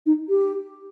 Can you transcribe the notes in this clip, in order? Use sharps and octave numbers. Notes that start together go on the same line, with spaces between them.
D#4
G4